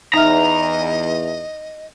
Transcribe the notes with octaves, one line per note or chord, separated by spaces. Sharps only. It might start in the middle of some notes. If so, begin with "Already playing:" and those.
E2 D#4 D#5 E5 A#5 F6